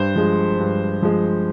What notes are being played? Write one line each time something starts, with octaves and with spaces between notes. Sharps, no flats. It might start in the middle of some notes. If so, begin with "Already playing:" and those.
Already playing: G2 C5
F3 G#3
G2
F3 G#3